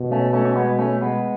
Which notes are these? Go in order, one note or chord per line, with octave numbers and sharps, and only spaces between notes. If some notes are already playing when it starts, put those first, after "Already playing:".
Already playing: B2
A3 C#4
A3 C#4
C#4
G#3 B3
A3 C#4
G#3 B3